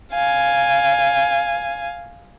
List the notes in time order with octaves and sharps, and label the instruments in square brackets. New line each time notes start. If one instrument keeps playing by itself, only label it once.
[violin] F5 G#5